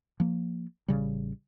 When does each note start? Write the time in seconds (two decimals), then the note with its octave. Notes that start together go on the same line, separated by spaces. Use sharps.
0.20 F3 A#3
0.88 A1 C#3 G3